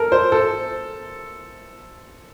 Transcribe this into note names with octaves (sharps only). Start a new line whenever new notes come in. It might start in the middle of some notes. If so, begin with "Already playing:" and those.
Already playing: A4 A#4
C5
A4